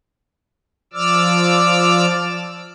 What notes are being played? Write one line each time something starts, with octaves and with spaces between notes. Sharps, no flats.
F3 D5 D6 E6 F6